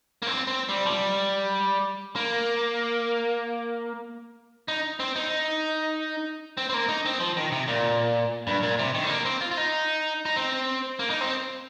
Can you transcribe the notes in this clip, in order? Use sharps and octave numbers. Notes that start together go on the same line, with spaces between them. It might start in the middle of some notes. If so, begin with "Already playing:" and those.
A#3
C4
C4
G3
F3
G3
A#3
D#4
C4
D#4
C4
C4
A#3
D#4
C4
F3
D#3
C3
A#2
G2
A#2
C3
D#3
G3
A#3
C4
F4
F4
D#4
D#4
C4
A#3
D#4
C4